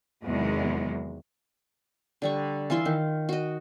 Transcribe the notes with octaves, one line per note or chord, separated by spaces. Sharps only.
E2 C3 D#3 F#3 G#3
D3 G3 C#6
E3 F4 E5 C6
D#3
F#4 D#5